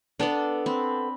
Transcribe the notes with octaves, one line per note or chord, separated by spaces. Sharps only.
B3 D4 A4 D5
C4 B5